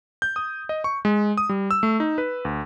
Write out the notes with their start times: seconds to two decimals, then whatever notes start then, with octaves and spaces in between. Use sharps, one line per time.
0.22 G6
0.36 D#6
0.69 D#5
0.84 C#6
1.05 G#3
1.38 D#6
1.49 G3
1.71 E6
1.83 A3
2.00 D#4
2.18 B4
2.45 D2